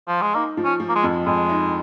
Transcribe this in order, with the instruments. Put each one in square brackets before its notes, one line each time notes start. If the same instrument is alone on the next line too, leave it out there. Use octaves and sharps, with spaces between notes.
[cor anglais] F3
G#3
[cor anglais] A#3 [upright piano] D#4
[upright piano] F3
[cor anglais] C#4
[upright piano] F3
[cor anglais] A#3
G#3
[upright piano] F2
[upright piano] F2 [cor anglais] G#3
[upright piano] D#4